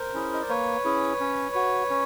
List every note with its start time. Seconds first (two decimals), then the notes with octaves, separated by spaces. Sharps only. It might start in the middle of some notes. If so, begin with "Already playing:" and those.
Already playing: A#4 C5
0.14 C#4 E4 G#4
0.34 D#5
0.42 D5
0.49 A#3 B4 C#5
0.85 C#4 E4 G#4
1.20 C#4
1.55 F#4
1.90 C#4